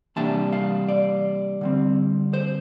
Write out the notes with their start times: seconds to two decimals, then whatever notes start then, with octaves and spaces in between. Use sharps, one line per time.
0.16 C3 E3 G3 A#3 D4 A5
0.52 F5
0.89 D5
1.61 D3 G3 C4
2.34 C5